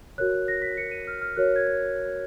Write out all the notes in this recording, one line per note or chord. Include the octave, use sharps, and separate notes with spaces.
F#4 A#4 C#5 F#6
A#6
B6
F#4 A#4 C#5 C#7
D#7
F6
F6
F#4 A#4 C#5 F#6
G#6